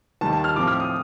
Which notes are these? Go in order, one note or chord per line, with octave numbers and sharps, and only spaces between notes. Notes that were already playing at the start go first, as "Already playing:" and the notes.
D#2 D#3 G3 A5
A5
F6
A2 F3 C4 D6
F6
D#6